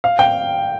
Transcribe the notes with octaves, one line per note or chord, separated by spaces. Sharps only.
F5
G5